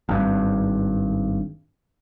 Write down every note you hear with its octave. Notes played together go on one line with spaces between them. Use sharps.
G#1 G2